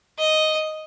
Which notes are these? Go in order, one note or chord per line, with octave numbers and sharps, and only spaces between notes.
D#5